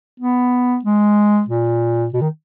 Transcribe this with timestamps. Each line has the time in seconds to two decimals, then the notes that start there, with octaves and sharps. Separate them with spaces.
0.20 B3
0.85 G#3
1.49 A#2
2.14 B2
2.21 D#3